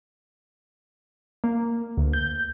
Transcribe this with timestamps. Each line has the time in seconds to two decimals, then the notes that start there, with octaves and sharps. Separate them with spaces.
1.44 A#3
1.97 D2
2.13 G6